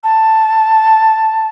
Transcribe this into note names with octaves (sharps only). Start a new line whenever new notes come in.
A5